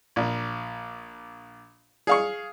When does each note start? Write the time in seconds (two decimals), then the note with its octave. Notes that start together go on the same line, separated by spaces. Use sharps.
0.16 A#1
2.07 G#4 F5 C#6